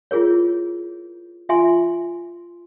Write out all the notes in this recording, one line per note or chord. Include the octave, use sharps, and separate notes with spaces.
E4 F4 G#4 A#4 C#5
F4 E5 G#5 C6